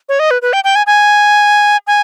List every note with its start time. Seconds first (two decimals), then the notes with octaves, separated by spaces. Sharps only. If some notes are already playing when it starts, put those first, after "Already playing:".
0.09 C#5
0.19 D#5
0.31 B4
0.42 B4
0.53 G5
0.64 G5
0.75 G#5
0.87 G#5
1.87 G#5